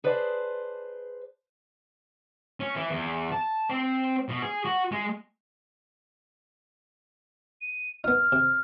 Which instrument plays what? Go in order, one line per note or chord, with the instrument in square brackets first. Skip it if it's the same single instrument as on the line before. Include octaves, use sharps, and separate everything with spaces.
[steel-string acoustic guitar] G#4 B4 C5 D5 G5 A5
[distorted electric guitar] C#4
E3
E2
A5
C4
B2
G#4
F#4
G#3
[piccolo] D#7
[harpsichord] B3 D#4 [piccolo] F6
[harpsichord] C3